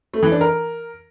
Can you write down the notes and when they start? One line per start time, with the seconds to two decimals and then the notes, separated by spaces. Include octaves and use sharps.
0.14 A3
0.23 E3
0.32 D4
0.41 A#4